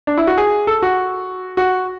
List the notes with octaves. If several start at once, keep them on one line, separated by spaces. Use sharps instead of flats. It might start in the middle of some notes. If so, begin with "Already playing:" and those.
D4
E4
F#4
G#4
A4
F#4
F#4